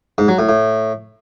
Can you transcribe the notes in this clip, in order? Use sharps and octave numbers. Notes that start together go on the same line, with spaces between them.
G#2
F#3
A2
A2